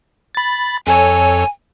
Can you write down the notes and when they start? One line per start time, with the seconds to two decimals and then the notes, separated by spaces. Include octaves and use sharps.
0.35 B5 A6
0.87 F2 A4 C#5 G#5